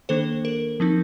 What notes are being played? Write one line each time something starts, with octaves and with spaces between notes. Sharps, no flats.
D#3 A#3 D4 A4 C5
A#4
F3 C4 D#4